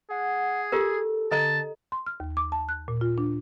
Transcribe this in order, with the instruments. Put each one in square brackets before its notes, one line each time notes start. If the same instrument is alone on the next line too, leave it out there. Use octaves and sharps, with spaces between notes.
[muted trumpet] G#4 [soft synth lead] F#5
[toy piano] F4 G4 A#4 [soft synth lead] A4
[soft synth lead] D3 [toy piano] A4 D#5 A#5 [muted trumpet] A5
[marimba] C6
F6
D#2
D6
A5
F#6
A#2
F4
D4